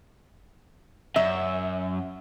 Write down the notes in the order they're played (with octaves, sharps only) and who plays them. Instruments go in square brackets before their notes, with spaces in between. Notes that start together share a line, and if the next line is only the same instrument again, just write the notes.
[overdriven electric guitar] F#2 [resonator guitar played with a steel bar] E5